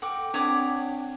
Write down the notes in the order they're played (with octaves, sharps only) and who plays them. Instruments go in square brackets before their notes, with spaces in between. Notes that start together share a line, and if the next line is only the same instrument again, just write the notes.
[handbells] A4 G5 [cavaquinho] F#5 D6
[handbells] C4 D4 [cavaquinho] C#5 F#5 D6